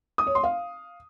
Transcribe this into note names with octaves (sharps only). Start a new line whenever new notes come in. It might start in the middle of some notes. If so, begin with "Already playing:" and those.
D#6
C#5
C6
F5